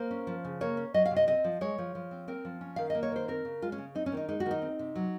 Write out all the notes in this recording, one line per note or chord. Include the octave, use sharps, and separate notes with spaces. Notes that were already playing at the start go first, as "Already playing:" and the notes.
Already playing: A#3 C5
C#4
F3
C#3
A#3 C#5
C#4
F#3 D#5
F5
C3
D#5
C4 D#5
F3
G#3 C#5
F3
F3
C4
C4 A#4
F3
C#4
D#3 F5
A#3 D#5
C#5
D#3 C5
C4 A#4
C#3
G#3 F4
C#4
C#3
C4 D#4
C#4
D#3 D#4
G#3 D#4
F#4
D#3
D#4
C4
C3
F#3